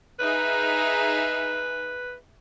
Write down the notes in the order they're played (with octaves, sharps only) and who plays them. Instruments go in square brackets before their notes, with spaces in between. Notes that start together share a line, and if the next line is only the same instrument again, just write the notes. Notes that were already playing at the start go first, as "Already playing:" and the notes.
[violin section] D#4 G#4 E5 [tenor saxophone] B4